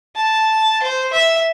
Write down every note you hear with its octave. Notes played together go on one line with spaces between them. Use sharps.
A5
C5
E5